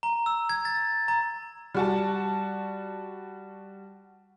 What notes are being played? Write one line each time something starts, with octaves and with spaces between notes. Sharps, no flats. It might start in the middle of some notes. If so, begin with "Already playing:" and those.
A#5
E6
G#6
A6
A#5
G3 F#4 A5